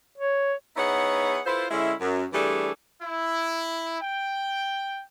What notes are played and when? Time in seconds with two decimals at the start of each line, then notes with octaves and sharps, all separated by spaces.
0.18 C#5
0.76 B3 D#4 E4 G#4 C#5 F#5
1.46 E4 F4 A4 B4 C5
1.71 D3 G#3 C#4 E4
2.01 F#2
2.33 E3 G3 A3 D4 G#4 A4
3.02 E4
4.00 G5